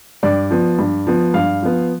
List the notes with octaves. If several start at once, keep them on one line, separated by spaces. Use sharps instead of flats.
G2 D5
F3 B3
G2
F3 B3
G2 F5
F3 B3